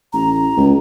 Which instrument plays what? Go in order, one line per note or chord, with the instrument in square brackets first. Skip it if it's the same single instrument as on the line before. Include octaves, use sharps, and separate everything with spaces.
[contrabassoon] A1 [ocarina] A#5
[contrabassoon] C#2